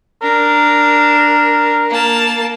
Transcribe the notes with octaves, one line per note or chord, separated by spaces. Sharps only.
D4 A#4
A#3 A5